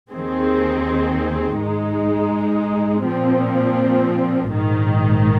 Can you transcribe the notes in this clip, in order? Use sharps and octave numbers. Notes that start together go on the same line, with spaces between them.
D#2 D#3 C4 G#4
G#2 G#3 D#4
A#2 F3 C4
A#1 G#2 D#3